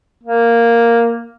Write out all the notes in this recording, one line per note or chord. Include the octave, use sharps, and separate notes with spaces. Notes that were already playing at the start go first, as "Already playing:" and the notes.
A#3